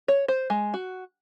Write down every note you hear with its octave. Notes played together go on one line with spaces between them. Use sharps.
C#5
C5
G#3
F#4